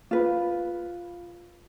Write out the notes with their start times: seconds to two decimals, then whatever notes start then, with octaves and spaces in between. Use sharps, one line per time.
0.11 F4 B4